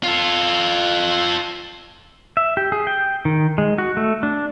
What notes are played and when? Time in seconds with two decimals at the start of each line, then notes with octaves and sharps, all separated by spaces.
0.03 F4 A4
2.37 E5
2.57 G4
2.72 G#4
2.87 G5
3.25 D#3
3.58 G#3
3.78 F#4
3.97 A3
4.23 D4